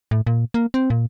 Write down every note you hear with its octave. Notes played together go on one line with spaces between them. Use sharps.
A2
A#2
A#3
C4
A#2